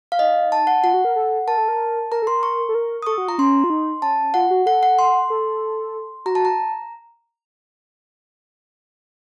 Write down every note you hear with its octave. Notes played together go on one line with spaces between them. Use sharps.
F5
D#4 D#5
A5
F#5
F4 F#5
F#4
A#4
A4
A#4 A5
A4
A#4
A#4 A#5
A4
A#4 C6
C#6
A4
A#4
D#6
A4 C#6
F#4
F4 A#5
C#4 C6
F4
D#4
C#4 A5
F4 F#5
F#4
A4 F#5
F#5
C6
A4
F#4 A#5
A5
A#5